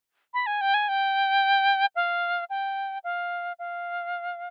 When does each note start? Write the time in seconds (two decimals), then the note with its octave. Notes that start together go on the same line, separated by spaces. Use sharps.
0.34 B5
0.46 G#5
0.61 G5
0.74 G#5
0.88 G5
1.95 F5
2.50 G5
3.04 F5
3.59 F5